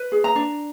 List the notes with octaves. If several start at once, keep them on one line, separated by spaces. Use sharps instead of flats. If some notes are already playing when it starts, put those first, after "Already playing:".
Already playing: B4
G#4
A#5
D4